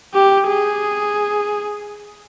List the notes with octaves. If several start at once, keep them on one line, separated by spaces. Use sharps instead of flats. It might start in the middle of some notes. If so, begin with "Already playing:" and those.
G4
G#4